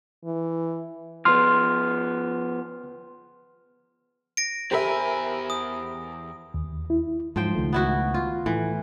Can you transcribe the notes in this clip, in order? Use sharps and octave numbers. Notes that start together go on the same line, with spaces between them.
E3
F3 B3 C6 F6
A#6 D7
E2 G4 A#4 C5 E5 G#5 B5
D#6
D#2
E4
G#2 F3 F#3 C5 G5
C#2 D#3 A3
B3 E4 F#4
F4
A2 E3 A3